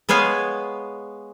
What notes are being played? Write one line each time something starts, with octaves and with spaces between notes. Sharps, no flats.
G#3 B3 C#5 F5 G#5